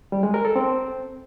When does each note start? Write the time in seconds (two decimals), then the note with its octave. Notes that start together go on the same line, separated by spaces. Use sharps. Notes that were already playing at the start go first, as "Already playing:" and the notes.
0.12 G3
0.23 G#3
0.34 A#4
0.45 A4
0.56 C4